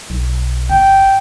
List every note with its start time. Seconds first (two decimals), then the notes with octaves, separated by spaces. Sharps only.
0.10 B1
0.70 G1 G5